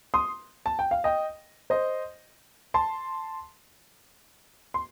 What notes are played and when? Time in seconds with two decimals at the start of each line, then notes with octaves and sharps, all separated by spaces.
0.14 C6 D#6
0.66 A5
0.79 G5
0.91 F5
1.04 D#5 G5
1.70 C5 D#5
2.74 A5 C6
4.74 C6